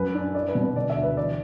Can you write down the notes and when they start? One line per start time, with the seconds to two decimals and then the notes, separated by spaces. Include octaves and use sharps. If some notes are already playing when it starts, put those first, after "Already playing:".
Already playing: F#2 B4
0.15 D4
0.34 E4 D5
0.48 B4
0.55 B2
0.62 B4
0.75 D3 D5
0.90 E5
0.97 D2
1.03 B4
1.17 E3 D5